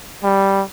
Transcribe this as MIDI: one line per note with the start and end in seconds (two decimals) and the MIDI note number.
0.23 0.63 55